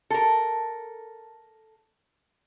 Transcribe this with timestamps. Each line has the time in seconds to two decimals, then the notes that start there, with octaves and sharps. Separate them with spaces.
0.10 A4 A#4